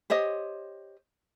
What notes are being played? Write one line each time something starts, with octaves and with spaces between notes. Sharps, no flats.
G4 C5 C#5 D#5